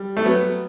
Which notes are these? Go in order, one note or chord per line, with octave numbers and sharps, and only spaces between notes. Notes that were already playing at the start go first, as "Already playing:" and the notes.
Already playing: G3
A3
F#3 B3